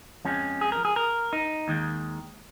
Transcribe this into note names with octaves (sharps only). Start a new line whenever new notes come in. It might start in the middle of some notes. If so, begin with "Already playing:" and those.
F2 F3 G#3 C#4
G#4
A#4
G#4
A#4
D#4
D#2 D#3 G#3